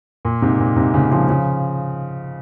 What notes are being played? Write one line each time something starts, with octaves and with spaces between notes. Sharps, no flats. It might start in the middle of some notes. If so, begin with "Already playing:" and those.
A#2
G#2 C3
A#2
G#2 C3
A#2 C#3
C#3 F3
C#3 F3